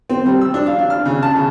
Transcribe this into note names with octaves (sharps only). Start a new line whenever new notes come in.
C4
G3
E6
D4
F5
D4
F6
C#3
A5
C#3